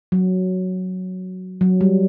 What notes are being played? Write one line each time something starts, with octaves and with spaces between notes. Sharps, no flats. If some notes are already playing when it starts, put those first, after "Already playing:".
F#3
F#3
G3